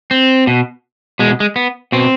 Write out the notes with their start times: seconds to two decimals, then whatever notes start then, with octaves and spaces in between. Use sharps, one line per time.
0.11 C4
0.47 B2
1.19 B2 G#3
1.40 G#3
1.56 B3
1.92 B2 C4